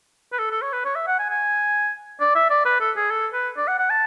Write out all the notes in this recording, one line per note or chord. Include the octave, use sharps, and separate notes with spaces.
B4
A4
A4
C#5
B4
C#5
E5
F#5
G#5
G#5
D5
E5
D5
B4
A4
G#4
A4
B4
D5
F#5
F#5
A5